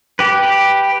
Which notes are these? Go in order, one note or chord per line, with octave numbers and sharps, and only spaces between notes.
G4 B4